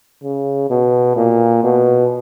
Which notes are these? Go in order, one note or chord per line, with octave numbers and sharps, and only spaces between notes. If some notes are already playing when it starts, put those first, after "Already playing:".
C#3
B2
A#2
B2